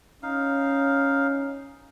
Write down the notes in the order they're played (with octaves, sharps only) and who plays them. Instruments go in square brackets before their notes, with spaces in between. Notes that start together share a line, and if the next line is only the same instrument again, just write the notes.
[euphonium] C#4 [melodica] D#4 F5